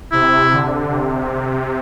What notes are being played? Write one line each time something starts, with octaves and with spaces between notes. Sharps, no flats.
C3 E4
D3
C3